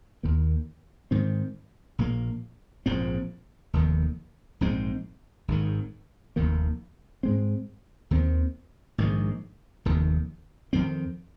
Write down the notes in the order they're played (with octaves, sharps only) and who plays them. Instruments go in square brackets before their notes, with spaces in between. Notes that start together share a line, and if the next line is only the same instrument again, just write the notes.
[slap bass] D#2 D#3 A#3
G#2 D#3 C4
A#1 A#2 A#3
A#1 G#2 F3 C4
F1 D#2 D#3
A#1 G#2 G#3 C4
G#1 G#2 D#3
F1 D#2 D#3 A#3
G#2 G#3 C4
D#2 D#3 C4
A#1 G#2 D#3 G#3
F1 D#2 D#3
F2 D#3 C4